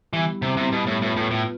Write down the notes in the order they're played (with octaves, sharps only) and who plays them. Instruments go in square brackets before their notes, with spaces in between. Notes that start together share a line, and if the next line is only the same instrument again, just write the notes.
[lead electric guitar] E3 [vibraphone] G3 B3 E4 G4
[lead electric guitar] C3
[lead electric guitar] C3 [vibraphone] G3 B3 E4 G4
[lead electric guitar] B2
A2
[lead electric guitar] A2 [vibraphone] B3 F4 B4
[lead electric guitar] A2
A2